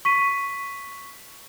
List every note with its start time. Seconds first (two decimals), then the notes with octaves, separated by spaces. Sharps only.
0.05 C#6 B6 D#7